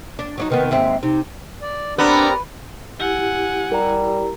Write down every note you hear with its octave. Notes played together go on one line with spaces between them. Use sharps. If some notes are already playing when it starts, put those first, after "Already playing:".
D4
F#3 D4 D#4
C3 D#3 B3 B4
D#2 G#2 C4 E5
C3 D#4
D5
B3 C4 D4 G4 A#4 D5 A#5
E4 G4 F#5 G#5
G3 A#4 A#5